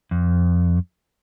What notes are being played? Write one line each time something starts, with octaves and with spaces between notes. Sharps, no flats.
F2